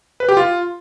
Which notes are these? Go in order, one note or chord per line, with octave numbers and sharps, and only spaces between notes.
B4
G4
F4